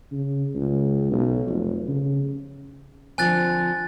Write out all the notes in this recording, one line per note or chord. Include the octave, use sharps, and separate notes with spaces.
C#3
C#2
B1
F1
C#3
D3 F3 C4 G#5 F#6 A6